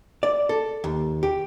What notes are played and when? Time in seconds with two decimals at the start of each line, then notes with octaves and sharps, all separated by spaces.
0.23 D5
0.49 A4
0.84 D#2
1.23 G4